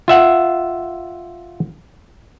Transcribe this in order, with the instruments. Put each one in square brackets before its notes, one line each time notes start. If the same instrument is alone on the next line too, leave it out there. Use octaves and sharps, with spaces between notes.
[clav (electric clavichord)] F4 E5 F#5